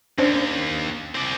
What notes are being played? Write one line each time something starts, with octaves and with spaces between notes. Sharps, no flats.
D#2 C#4 D4 C5
C4 D5